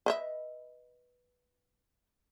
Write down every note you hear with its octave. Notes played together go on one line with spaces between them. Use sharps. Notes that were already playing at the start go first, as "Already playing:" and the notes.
B4 D#5 E5